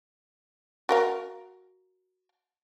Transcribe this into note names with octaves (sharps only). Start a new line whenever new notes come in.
F#4 A#4 F5